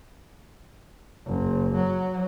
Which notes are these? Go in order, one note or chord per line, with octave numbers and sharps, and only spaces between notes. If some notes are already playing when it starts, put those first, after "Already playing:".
F#1
F#3